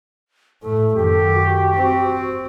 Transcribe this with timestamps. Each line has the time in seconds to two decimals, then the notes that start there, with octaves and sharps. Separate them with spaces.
0.63 A2 A3 A4
0.95 F#2 D#3 G4
1.34 F#4
1.75 C4